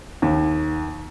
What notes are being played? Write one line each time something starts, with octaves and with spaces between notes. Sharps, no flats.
D#2